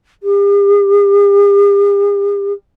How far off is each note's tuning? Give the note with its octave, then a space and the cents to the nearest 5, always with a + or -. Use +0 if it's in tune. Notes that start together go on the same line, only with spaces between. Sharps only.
G4 +45